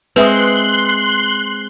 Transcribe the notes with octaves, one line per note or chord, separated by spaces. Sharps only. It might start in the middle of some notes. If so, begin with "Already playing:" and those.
G#3 C4 B4 E5 C6 D#6 F#6